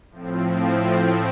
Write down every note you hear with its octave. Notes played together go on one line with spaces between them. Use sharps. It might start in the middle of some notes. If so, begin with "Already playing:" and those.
A2 F3 C4